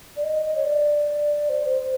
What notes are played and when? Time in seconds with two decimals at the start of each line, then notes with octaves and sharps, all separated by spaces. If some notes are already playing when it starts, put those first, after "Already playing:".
0.16 D5
0.23 D#5
0.45 D#5
0.56 C#5
0.65 D5
1.49 C5
1.70 C5